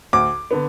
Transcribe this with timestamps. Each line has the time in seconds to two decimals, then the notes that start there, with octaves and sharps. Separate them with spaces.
0.13 D2 D6
0.51 D3 B3